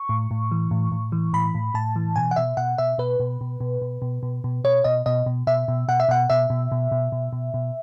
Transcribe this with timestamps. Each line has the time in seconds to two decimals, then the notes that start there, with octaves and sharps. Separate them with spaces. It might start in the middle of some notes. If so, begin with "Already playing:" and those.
Already playing: C#6
0.09 A2
0.31 A2
0.51 E3
0.71 A2
0.92 A2
1.12 E3
1.33 A2 B5
1.54 A2
1.74 A2 A5
1.96 E3
2.16 B2 G#5
2.31 F#5
2.36 B2 E5
2.57 B2 F#5
2.78 B2 E5
2.98 B2 B4
3.20 B2
3.41 B2
3.60 B2
3.82 B2
4.02 B2
4.23 B2
4.44 B2
4.64 B2 C#5
4.84 B2 D#5
5.06 B2 D#5
5.26 B2
5.47 B2 E5
5.68 B2
5.88 B2 F#5
6.00 E5
6.09 B2 F#5
6.30 B2 E5
6.50 B2
6.72 B2
6.92 B2
7.12 B2
7.33 B2
7.54 B2